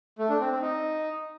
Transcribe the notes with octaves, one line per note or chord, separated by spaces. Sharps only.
A3
D4
C4
C4
D#4